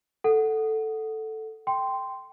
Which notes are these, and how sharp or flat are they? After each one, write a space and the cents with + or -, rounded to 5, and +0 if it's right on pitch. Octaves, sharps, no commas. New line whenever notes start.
A4 +0 F#5 +0
G5 +0 C6 -10